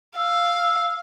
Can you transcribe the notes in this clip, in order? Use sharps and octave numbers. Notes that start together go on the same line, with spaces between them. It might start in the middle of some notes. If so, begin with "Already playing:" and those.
F5 E6